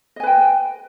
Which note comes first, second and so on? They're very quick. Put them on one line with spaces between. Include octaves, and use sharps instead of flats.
D#5 G#5 B4 G5